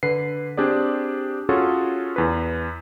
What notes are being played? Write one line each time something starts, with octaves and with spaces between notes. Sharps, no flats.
D3 B4 C7
C4 D4 G4 G#4 D5
C#4 F4 F#4 G#4 A4 C#5
E2 B4